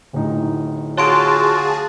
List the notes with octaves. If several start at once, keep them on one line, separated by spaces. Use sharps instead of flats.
D1 A2 D#4
F4 F#4 G#4 C#5 A5 C6 D7